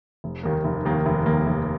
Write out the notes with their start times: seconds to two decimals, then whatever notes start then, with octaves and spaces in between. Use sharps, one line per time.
0.24 F1
0.43 D#2 D#3 A#3
0.65 F1
0.85 D#2 D#3 A#3
1.06 F1
1.26 D#2 D#3 A#3
1.47 F1